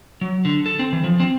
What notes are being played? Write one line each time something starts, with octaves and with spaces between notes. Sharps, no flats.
F#3
D3
A4
C4
E3
F3
C4